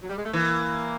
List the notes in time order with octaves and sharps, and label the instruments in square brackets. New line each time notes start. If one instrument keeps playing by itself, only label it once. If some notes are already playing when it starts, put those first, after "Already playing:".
[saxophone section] F#3
G3
G#3
A3
[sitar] E3 [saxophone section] A#3